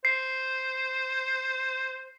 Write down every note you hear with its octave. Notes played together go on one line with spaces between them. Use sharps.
C5 C7